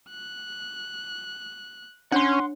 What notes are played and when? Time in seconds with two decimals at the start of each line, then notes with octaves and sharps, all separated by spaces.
0.10 F#6
2.12 C#4 D4 C#5 F#5 C6